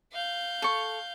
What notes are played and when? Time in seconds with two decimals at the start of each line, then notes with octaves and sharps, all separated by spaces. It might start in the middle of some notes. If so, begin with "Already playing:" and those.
0.12 F5 G6
0.62 A4 C#6